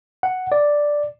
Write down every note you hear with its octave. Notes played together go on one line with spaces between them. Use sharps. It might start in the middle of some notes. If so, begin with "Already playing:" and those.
F#5
D5